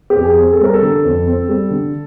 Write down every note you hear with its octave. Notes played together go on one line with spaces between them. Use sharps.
G4
F2
G#4
C4
A4
G3 A#4
A4
D3
F2
C4
G3
D3